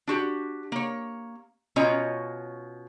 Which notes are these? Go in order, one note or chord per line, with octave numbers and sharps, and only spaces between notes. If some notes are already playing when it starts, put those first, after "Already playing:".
D4 F#4 G4
A#3 C#5
B2 C#4 F4 C#5 D#5 A#5